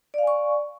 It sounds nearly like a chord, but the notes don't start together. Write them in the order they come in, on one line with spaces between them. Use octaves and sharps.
D5 F5 G#5 C#6